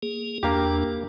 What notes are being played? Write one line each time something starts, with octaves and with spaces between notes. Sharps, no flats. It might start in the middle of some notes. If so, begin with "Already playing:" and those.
A#3 G#4
E2 A#3 D4 G4